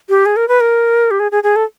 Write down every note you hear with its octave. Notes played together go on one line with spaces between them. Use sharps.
G4
G#4
A#4
B4
A#4
G4
G#4
G#4
G#4
A4